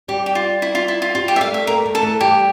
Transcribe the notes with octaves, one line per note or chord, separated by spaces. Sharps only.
G3 G4
G4
F4
E4
F4
E4
F4
G3 F4
G4
E5
A3 F5
E5
A#3 A#4
A3
A4
E3
G3 G4